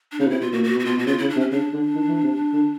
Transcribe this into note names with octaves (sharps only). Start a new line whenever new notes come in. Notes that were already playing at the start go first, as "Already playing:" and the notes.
D4
C#3 D#4
B2
C3 E4
B2 F4
A#2 F#4
A#2 F#4
B2
F#4
B2 F4
B2 F#4
C#3 F4
C#3 E4
D4
C3
C#4
C#3 D4
D3
D#3
E3
C3
D3